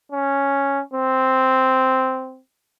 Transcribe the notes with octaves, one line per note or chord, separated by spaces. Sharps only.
C#4
C4